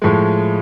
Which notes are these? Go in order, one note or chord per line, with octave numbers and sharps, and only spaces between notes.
A2 F3 G#3